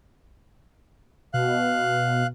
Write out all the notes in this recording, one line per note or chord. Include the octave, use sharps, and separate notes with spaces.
B2 F5 F#6